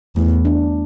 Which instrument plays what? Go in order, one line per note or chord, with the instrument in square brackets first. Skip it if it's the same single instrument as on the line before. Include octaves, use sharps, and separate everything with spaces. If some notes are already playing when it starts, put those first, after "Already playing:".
[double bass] E2 [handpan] A3
[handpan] D4